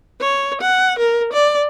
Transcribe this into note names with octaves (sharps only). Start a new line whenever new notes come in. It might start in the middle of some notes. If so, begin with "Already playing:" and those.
C#5
F#5
A#4
D5